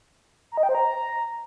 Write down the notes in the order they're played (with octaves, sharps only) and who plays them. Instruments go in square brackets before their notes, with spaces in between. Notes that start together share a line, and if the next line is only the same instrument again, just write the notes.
[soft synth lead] A#5
D#5
G5
C5
A#5